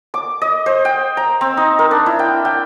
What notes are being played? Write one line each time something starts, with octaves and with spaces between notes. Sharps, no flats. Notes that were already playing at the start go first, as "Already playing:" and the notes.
D6
D#5
C5
G5
A#5
C4
D#4
A#4
D4
E4
G5
G5